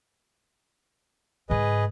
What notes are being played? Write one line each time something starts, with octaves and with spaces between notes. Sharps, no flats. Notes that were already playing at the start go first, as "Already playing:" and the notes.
G#2 C#3 G#4 B4 D#5